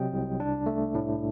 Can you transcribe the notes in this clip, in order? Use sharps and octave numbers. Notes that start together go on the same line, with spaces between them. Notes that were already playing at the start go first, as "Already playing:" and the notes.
Already playing: C3 F#3 C4 D#5 G5
C2
D4
A3
A2